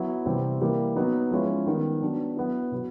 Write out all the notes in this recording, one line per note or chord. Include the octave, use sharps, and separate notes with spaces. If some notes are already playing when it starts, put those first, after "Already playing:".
Already playing: F#3 B3 E4
C3 E3 G3 C4
E3 G3 A#3
F#3 B3 D#4
F3 G#3 C#4 E4
D#3 G3 B3
F#3 B3 D4
F#3 B3 E4
B2 F#3 B3